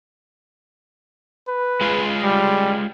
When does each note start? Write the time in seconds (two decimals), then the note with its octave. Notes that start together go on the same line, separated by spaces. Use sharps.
1.48 B4
1.81 G#3 F4 G#4
2.23 G3